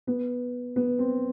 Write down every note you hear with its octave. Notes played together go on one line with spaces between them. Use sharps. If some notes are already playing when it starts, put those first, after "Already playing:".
B3
B3
C4